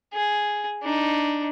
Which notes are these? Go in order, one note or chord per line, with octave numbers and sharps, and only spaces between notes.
G#4
D4 D#4